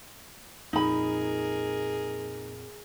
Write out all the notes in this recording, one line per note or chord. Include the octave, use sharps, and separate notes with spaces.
F2 A#2 D#4 G#4 A#4 B5